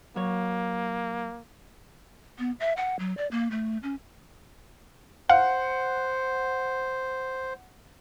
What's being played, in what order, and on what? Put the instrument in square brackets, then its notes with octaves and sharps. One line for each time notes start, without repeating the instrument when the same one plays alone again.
[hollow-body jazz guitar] F#3 C#5 [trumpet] A#3
[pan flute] B3
E5
F#5
F#3
D5
A#3
A3
C#4
[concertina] C5 [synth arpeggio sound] F5 [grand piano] F#5